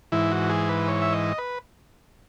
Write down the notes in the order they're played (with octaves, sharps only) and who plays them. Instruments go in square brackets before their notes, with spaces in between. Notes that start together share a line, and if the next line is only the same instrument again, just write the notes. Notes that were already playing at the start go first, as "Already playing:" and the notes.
[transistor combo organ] G#2 E3 E4
F#4
G#4
B4
C#5
E5
D#5
B4